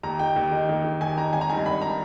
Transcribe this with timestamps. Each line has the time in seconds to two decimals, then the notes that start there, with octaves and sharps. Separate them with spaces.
0.03 D#2 A#5
0.19 D#3 G5
0.36 D#2
0.52 D#3
0.69 D#2
0.85 D#3
1.01 D#2 G#5
1.17 D#3 A#5
1.33 G#1 G#5
1.41 A#5
1.50 G2 D#3 G#5
1.58 A#5
1.66 G#1 B5
1.81 D#3 A#5